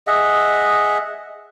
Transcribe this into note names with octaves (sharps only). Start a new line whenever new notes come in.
G#4 D#5 E5 F#5